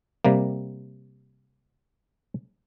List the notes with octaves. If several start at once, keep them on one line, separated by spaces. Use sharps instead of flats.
C3 G3 A#3